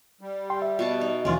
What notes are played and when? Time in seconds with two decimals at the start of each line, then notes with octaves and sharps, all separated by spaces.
0.21 G3
0.50 G5 C6
0.62 E5
0.79 B2 F#4 A5
1.01 D#4
1.25 D#2 B2 E3 C#4 F4 D5